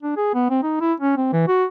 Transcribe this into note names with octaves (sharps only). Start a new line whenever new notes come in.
D4
G#4
B3
C4
D#4
E4
C#4
C4
E3
F#4